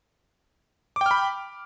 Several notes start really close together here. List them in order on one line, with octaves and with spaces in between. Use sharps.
D6 G5 F6 B5